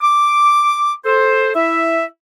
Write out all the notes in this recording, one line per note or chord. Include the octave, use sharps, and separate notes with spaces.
D6
A4 C5
E4 E5